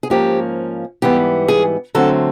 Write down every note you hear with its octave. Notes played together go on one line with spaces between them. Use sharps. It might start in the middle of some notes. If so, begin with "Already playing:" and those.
G#4
G#2 F3 A#3 C#4 G4
G#2 E3 G3 B3 G4
G#4
D3 F#3 A3 C4 A4